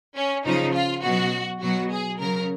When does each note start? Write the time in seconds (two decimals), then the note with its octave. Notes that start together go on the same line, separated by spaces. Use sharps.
0.16 C#4
0.45 C#3 F3 D#4
0.74 F4
1.03 B2 F#3 F#4
1.61 B2 F#3 F#4
1.91 G#4
2.20 C#3 F#3 A#4